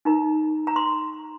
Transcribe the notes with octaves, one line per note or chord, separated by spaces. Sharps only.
D#4 A#4 A#5
A#5
C6